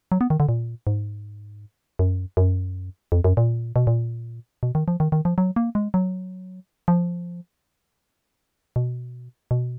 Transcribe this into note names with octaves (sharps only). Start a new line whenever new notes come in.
F#3
B3
D#3
D3
A#2
G#2
F#2
F#2
F2
F#2
A#2
B2
A#2
B2
D#3
F3
D#3
D#3
F3
F#3
A#3
G#3
F#3
F3
B2
B2